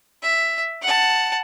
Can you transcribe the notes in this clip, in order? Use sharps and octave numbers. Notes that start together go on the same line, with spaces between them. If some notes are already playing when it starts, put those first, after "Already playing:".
E5
F#5 A5